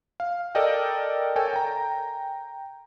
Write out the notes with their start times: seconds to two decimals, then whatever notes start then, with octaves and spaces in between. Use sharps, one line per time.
0.20 F5
0.55 A4 A#4 D5 D#5 G5
1.36 A4 A#4 C#5 G5 G#5
1.53 G5 A#5